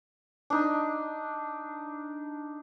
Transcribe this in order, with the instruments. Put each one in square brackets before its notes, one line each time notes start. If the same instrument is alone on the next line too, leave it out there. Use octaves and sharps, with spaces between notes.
[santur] D4 D#4